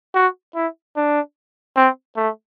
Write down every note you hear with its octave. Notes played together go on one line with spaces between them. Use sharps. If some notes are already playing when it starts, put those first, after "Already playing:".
F#4
E4
D4
C4
A3